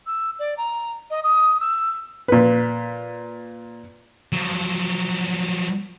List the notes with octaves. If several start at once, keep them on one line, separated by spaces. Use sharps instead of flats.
E6
D5
A#5
D#5
D#6
E6
A#2 B4
F3 F#3